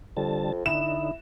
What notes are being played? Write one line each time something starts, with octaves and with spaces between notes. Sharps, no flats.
F2 D3 G3 A5
D3 D#4 E4 E7